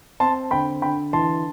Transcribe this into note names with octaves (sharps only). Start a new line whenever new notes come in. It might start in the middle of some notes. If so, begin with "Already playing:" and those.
C4 A5 C6
D3 G5 B5
D3 G5 B5
E3 A5 C6